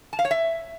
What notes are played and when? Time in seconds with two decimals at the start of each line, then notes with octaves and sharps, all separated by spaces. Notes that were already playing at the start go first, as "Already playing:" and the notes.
0.13 A5
0.19 F5
0.25 C#5
0.31 E5